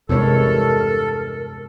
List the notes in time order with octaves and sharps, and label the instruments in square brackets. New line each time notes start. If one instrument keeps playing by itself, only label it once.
[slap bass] E2 G2 [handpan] C3 G#3 C#5 [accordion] A4 [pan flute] A#4